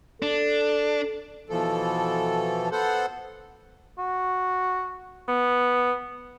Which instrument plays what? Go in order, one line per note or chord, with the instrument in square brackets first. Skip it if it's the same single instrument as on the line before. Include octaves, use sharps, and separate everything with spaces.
[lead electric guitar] D4 [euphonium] A4
[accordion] B2 E3 F3 A4
B3 A4 C5 F#5
[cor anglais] F#4
B3